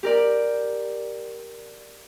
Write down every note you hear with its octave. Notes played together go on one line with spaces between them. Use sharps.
G4 A#4 D5